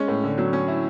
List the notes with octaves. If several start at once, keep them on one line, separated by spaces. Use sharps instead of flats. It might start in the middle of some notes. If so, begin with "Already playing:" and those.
Already playing: G#3 C#4
A2
D3
F#3
C#4
E4